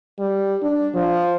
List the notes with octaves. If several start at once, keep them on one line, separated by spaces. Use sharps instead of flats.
G3
D4
F3